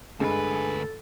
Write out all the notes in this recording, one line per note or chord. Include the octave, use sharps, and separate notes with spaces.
D2 G2 G#3 A4 B4 G#5